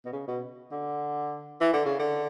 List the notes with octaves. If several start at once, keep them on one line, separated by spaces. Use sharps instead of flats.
B2
C#3
B2
D3
E3
D3
C#3
D3